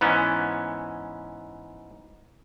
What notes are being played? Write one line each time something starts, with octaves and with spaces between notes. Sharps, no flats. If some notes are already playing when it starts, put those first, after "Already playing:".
G#2 E3 B3 C#4